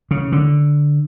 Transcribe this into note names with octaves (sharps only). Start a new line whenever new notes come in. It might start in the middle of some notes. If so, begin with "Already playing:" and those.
C#3
D3